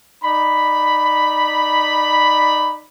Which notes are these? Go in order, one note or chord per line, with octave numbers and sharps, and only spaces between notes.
D#4 D5 B5